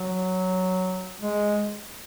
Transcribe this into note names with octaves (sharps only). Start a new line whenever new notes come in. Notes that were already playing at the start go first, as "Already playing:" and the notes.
Already playing: F#3
G#3